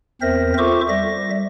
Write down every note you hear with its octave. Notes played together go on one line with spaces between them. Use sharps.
E2 C4 A#4 C5 E5 A#6
F4 A4 C5 E5 C#6 D6
G3 E5 A#6